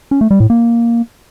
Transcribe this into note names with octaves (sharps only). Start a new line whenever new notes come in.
C#4
A3
G3
A2
A#3